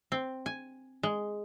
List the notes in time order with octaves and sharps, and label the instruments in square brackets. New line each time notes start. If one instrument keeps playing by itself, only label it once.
[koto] C4
G#5
G#3